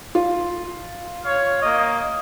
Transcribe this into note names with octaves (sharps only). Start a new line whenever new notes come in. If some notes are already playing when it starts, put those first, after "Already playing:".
F4
C#5 F5
A#3 D#5